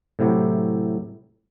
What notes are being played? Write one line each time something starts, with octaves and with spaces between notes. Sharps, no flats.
A2 C3 F#3 E4 G4